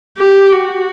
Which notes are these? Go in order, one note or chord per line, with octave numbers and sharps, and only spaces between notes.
G4
F#4